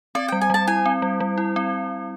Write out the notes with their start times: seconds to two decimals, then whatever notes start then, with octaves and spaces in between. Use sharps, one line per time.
0.15 C4 D5
0.28 G3 G5
0.41 G#5
0.50 G3 A5
0.67 E4 G#5
0.86 C4
1.02 G3
1.20 G3
1.38 E4
1.56 C4